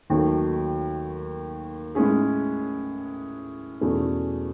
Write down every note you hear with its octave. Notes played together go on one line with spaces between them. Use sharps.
D#2 D#3 F#3 A3
A2 G#3 C#4 G#4
E2 B2 A3 C#4 G#4